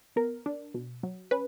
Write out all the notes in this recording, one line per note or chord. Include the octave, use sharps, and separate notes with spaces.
B3 A#4
D4
B2
F#3
C#4 B4